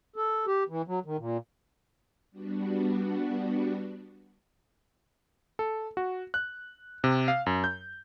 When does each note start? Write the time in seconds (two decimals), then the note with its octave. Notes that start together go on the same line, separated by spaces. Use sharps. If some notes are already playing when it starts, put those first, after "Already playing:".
0.16 A4
0.47 G4
0.69 E3
0.87 F#3
1.05 D#3
1.18 A#2
2.31 G3 B3 D4 F#4
5.59 A4
5.97 F#4
6.34 F#6
7.04 C3
7.28 F5
7.46 F#2
7.64 G6